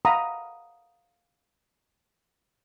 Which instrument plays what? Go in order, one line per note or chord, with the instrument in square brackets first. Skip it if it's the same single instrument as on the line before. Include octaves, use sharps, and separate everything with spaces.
[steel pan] F5 F#5 A#5 B5 D#6